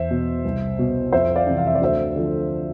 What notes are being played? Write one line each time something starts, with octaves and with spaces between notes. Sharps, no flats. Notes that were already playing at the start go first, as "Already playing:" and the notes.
Already playing: E2 C5 E5
B2
C2
B2
F2 C5 E5
D5 F5
C3 E3
F5
E5
D5
D2 C5 E5
D3 F3